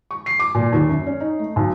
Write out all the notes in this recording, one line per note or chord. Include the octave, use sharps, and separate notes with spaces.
C#6
C7
D6
A#2
D#2
F#2
C#4
D#4
A3
B1